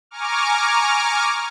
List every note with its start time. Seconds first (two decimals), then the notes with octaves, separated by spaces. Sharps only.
0.11 G#5 A#5 C#6 D6 F6